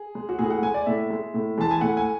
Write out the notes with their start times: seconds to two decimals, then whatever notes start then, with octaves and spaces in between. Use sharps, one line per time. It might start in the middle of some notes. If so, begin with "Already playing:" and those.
Already playing: G#4
0.15 G#3
0.29 F#4
0.39 A2 G#4
0.50 F#5
0.62 G#3 G#5
0.74 D5
0.86 A2 E5
1.10 G#3
1.34 A2
1.58 E3 G#3 A5
1.71 G#5
1.81 A2 F#5
1.97 G#5